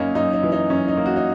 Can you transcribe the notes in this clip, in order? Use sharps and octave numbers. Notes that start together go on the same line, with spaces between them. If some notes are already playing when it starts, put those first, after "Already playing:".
Already playing: F#2 A#3 C#4 D#4
F#2 D#4
D#4
E3
D#4
F#2 C#4
D#4
A#3
F#4
D#4